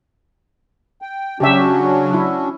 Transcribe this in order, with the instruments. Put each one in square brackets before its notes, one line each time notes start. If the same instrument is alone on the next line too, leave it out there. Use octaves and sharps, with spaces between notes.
[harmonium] G5
[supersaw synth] C#3 F#3 [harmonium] C#4 D4 F#4 [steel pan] G4 E5
[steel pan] E4